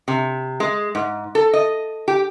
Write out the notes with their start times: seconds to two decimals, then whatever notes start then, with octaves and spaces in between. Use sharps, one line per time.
0.08 C3
0.60 G#3
0.95 G#2
1.35 A4
1.53 D#5
2.08 G4